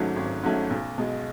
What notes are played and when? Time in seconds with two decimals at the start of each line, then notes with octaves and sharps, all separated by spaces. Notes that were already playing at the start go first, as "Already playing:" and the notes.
Already playing: G#1 G#2 F#3 A3 C#4
0.16 G#1
0.43 G#2 F#3 A3 C#4
0.70 B1
0.98 B2 G#3